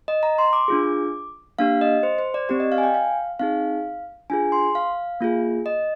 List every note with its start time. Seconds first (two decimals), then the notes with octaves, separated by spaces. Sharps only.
0.08 D#5
0.23 A#5
0.38 C6
0.53 D6
0.68 D4 F4 G#4
1.59 A#3 D4 G4 F5
1.81 D#5
2.03 C5
2.18 C5
2.34 D5
2.49 C4 G4 D5
2.60 D#5
2.72 F5
2.78 G#5
2.83 G5
2.94 F5
3.39 C4 D#4 G#4 F5
4.30 D4 F4 G#4 G#5
4.52 C6
4.75 F5
5.21 A#3 F4 G#4
5.66 D#5